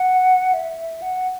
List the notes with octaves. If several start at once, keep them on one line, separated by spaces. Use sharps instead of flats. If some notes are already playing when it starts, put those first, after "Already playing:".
Already playing: F#5
E5
F#5